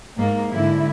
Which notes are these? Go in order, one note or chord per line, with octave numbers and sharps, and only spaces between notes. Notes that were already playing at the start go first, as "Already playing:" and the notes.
G#2 A#3
G#2 D3 E4